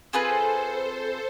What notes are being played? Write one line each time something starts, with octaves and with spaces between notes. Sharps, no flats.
C4 F4 G#4 A4 B4 C5